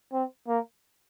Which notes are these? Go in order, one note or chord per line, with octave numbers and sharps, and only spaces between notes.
C4
A#3